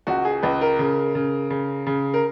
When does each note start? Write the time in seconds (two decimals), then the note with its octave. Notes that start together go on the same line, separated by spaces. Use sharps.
0.07 C#2 F#4
0.25 G#4
0.43 C#2 B4
0.61 A#4
0.79 C#3
1.15 C#3
1.50 C#3
1.87 C#3
2.14 A#4